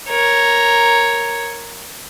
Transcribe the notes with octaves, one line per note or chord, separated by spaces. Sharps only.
A#4 C#5